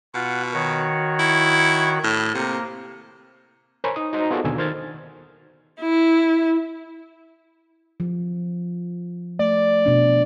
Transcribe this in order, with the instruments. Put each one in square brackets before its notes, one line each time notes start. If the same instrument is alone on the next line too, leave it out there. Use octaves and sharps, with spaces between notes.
[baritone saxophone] B2 [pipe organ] F4 F#5
[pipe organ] D#3 F#4 C#5
[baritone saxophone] E4
A2
[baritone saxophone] C3 [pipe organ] A#3
[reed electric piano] A#4 C5 C#5 G#5 A#5 B5
D#4 D#6
D#4 F#4 C5 D#5 A#5
B3 F4 F#4 G#4 A4 D5
D#2 B2 D3 G#5 E6
D#3 C5 F6 G#6 A6
[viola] E4
[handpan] F3
[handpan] A3 [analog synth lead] D5
[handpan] B2 D4